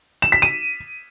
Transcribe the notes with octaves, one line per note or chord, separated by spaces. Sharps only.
E7
B6
D#7